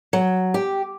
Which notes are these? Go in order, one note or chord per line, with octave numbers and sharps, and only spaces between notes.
F#3
G4